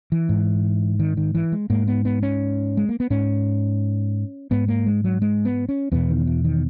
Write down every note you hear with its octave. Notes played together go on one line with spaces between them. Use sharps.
E3
G#2
D#3
D#3
E3
G#3
G#2 A#3
B3
B3
C#4
G#3
A#3
B3
G#2 C#4
G#2 B3
A#3
G#3
F#3
G#3
B3
C#4
E2 B2 B3
D#3
E3
D#3